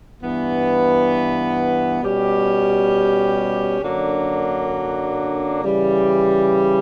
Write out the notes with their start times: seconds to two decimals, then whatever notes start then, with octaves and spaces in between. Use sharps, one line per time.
0.22 G2 E3 B3
2.02 B2 G3 C#4 G4
3.82 F#2 D3 F#3 A#3 D4
5.62 C#3 E3 G3